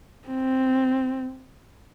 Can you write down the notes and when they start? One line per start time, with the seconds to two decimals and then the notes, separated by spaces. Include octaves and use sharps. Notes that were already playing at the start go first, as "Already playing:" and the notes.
0.28 C4